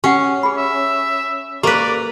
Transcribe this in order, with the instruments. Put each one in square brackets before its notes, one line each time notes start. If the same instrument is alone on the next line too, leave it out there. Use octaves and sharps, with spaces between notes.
[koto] C#4 [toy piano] G4 F#5
[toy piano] G#4 B5
[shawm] E5
[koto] A#3 B4 [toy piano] G4 A4 C5 [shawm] D5